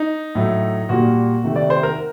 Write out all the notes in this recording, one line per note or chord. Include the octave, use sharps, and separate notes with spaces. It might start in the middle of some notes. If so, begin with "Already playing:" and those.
Already playing: D#4
A2 F#3 A3
A#2 G3 A#3 F#4
C3 D#3 A3
D5
C5
A#4